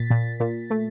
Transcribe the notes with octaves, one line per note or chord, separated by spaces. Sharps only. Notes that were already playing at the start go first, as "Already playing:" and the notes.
Already playing: A#2 A6 B6
A#2
A#2
A3